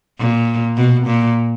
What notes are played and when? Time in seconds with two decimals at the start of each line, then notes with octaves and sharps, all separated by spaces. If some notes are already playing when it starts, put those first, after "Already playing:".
0.19 A#2
0.77 B2
1.07 A#2